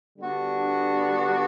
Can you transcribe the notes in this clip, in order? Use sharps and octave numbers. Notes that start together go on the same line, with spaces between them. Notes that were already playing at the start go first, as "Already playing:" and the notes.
D3 G3 B3 D4 F#4